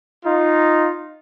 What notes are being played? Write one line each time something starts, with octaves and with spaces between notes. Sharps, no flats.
D#4 F4